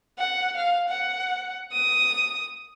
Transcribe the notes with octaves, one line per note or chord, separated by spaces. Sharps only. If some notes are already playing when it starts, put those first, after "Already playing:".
F#5
F5
F#5
D#6